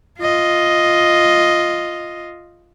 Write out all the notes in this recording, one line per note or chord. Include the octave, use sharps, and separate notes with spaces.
F4 D#5